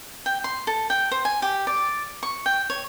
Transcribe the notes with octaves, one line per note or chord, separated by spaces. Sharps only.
G5
C6
A4
G5
C5
G#5
G4
D5
C#6
G5
C#5